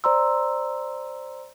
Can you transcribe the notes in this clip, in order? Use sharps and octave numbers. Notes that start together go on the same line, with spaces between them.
C5 D5 A#5 C6 E6